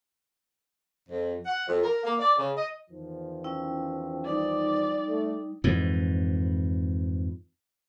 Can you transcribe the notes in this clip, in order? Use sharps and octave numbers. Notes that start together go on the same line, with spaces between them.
F2
F#5
F2
A#4
A#3
D5
C#3
D#5
E2 D#3 F3
C#4 E4 G5
G3 D#4 D5
A3
F2 G#2 E3